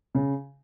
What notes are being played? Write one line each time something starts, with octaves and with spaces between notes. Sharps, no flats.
C#3